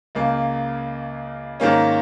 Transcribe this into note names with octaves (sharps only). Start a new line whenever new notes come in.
C#2 C#3 A#3
G#2 D#3 A#3 C#4